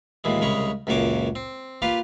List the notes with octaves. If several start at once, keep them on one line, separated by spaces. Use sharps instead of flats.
D#2 A#2 E3 G#3
C2 C#3 G#3 A#4 B5 C#6
C#2 F#2 A#2 F#4 C#5 D6
C4
A#3 F4 G4 B4 F5